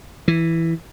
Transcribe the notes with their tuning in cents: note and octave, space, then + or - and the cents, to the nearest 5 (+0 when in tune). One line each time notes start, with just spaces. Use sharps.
E3 +0